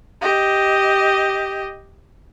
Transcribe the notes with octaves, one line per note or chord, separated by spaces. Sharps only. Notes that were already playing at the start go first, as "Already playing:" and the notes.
G4 D#5